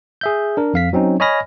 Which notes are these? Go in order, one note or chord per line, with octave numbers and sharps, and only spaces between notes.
G#4 E5 G6
D4 A#4
F2 F5 B6
F#3 C4 C#4 D#4
C#5 D#5 G#5 B5 F6 A#6